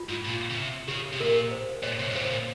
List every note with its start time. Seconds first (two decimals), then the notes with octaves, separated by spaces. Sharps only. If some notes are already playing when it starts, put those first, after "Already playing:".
Already playing: F4
0.09 G#2
0.25 A#2
0.50 C#3
0.56 C3
0.88 C#3 G4
1.13 C3
1.20 A#2 A#4
1.51 C5
1.83 A#2 C#5
1.99 C3
2.10 G#2
2.15 A#2 C5
2.24 C3
2.31 A#2